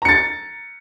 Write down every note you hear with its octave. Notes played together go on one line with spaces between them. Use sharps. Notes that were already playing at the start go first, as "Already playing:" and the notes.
A#5 A6 C#7